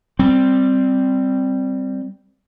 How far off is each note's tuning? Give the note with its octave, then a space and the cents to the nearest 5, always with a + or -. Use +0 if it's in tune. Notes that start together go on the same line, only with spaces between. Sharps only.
G3 +0 C4 +0